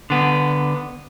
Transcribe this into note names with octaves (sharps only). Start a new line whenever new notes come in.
D3 B3